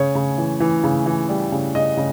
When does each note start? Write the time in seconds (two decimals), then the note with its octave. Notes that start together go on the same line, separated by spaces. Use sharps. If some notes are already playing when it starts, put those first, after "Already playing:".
Already playing: C#3 C#5
0.15 C#3
0.38 E3
0.60 E3
0.84 C#3
1.06 E3
1.29 G3
1.52 C#3
1.75 C#3 D#5
1.97 C#3